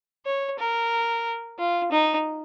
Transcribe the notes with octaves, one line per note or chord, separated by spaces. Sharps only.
C#5
A#4
F4
D#4